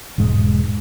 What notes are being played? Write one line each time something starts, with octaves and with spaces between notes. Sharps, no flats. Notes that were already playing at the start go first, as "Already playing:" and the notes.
E1 G#2 G#3